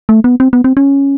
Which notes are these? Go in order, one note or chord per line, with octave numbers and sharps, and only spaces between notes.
A3
B3
C4
B3
C4
C#4